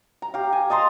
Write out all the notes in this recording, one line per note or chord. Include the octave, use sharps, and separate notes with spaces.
A#5
G4 F5
G#5
D#5 A5 A#5 C6